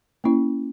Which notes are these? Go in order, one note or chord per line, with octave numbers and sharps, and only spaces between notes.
A#3 C#4 E4